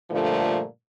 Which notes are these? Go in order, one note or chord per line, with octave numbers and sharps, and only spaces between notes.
G2 A#2 D3 F3 A3